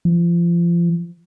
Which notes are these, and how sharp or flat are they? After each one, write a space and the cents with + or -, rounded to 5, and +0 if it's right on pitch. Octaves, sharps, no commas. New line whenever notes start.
F3 -30